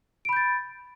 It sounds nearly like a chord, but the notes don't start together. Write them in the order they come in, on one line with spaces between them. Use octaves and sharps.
D7 B5 G6 A6